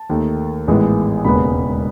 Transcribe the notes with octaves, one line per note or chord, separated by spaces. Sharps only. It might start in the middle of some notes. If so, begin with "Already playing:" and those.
Already playing: A5
D#2 D#3 A3
A1 G#2 E3 G#3 B3
E1 D#2 C#3 G#3 B3 B5